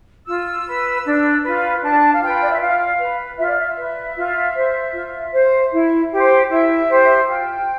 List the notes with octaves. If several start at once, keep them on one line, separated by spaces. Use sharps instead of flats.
F4 E6
B4
D4
F4 B4
D4 A5
F5
F4 B4 G5
D5
E5
F4 F5
B4
F4 E5
D5
E5
B4
F4
C5
F4
C5
E4
G4 C5
E4 E5
G4 C5
F4 G5